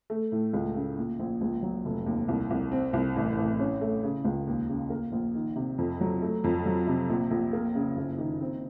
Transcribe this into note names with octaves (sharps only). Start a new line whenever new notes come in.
A3
A2
C#2
C#3
A#2
A#1
C#2
F#3
F1
D#2
C2
C2
C4
C2
A1
A1
C#4
A3
C#3
C#2
D#2
C#3
A#3
A#1
D#3
C3
F2
F#3
A3
F2
F#3
C3
A#1
A#1
A#3
C#3
F#1
D#3
C4